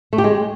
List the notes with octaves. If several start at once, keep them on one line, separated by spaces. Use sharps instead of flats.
A3
G4
G#3